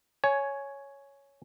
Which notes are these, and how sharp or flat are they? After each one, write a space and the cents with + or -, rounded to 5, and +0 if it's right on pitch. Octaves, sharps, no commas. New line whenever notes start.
C#5 +0 G#5 +15